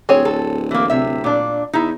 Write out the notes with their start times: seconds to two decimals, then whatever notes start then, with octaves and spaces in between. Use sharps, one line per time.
0.09 D1 C4 G#4 C#5
0.25 A4
0.71 E3 A#3
0.90 C3 E5
1.24 A#2 D4
1.73 E2 D#4 E4